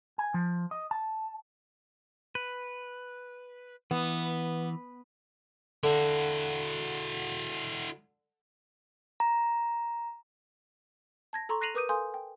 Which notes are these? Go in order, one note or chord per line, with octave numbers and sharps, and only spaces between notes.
G#5
F3
D#5
A5
B4
E3 B3
D3 E4 F#4
A#5
A5 G#6 A#6
A4 A#5 C6 C#6
F#6 A#6 C7 D#7 F7 F#7
A#4 B4 D6 D#6 G6 D#7
A4 F5 G#5 C6 D#6 G6
G5